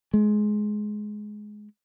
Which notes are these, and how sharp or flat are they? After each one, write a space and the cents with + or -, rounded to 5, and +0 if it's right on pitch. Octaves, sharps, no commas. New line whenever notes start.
G#3 +15